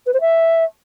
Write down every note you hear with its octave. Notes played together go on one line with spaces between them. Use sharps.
B4
C5
E5